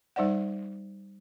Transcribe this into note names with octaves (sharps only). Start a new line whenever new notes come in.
G3 D#4 C5 D5 F#5